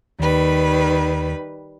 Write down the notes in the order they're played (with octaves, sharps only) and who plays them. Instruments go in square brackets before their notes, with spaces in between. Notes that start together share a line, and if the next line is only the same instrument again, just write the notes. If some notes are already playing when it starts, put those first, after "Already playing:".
[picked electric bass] D#2 [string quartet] D#3 G3 B4